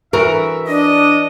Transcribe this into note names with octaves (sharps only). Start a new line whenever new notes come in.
E3 F#4 A#4 E5
D4 D#5